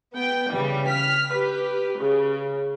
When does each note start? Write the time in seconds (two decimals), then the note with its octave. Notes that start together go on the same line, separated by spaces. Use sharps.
0.14 B3 G5
0.50 C#3 E3 G3
0.86 F6 B6
1.32 G4 B4
1.98 C#3